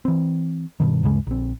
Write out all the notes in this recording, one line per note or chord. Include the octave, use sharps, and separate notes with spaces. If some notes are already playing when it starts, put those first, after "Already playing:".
E3 C4
G2 B2 D#3
D2 G2 C#3 G#3
A#1 C4